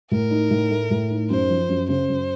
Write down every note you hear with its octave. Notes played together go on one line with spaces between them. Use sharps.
A2 A#4
D#4
A2
A3
A2
D#4
F#2 C5
F3
F#2
C#3 C5
F#2